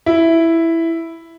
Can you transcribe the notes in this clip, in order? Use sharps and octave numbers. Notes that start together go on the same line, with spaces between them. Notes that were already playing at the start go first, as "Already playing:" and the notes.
E4